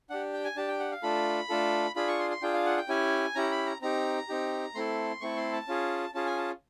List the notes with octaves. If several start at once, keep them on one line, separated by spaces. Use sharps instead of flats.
D4 G4 F#5
G5
G#5
D4 G4 A5
G5
F#5
F5
A3 D4 F4 A4 B5
A3 D4 F4 A4
D4 F4 G#4 B5
C#6
C6
C6
D4 F4 G#4 G5
F5
F#5
G5
C#4 E4 G4 G#5
C#4 E4 G4 A#5
B5
A#5
C4 D#4 G4 A#5
C4 D#4 G4
A3 C4 E4 A4 C6
A3 C4 E4 A4 C#6
C6
A5
C#4 F4 G#4
C#4 F4 G#4 A5
G#5
A5